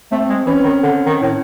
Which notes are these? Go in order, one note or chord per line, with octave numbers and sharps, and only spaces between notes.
A3 C4
G#3
E3 C#4
D#3
D3
D#3
A2